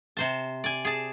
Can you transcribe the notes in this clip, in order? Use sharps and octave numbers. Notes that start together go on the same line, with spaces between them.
C3 C5 A5
D5 G#5
G#4 A5